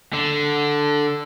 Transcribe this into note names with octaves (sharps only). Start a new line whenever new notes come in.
D3